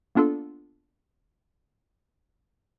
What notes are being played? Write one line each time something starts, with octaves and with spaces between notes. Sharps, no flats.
A#3 B3 D4 F4 A4